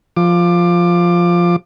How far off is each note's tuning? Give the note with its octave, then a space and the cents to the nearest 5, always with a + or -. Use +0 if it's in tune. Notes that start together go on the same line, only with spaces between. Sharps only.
F3 +0 D6 +20